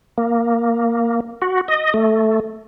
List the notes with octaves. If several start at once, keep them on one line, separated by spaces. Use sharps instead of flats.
A#3
F#4
D#5
A3